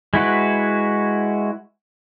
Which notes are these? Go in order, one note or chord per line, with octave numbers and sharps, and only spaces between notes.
G#3 E4 F#4 B4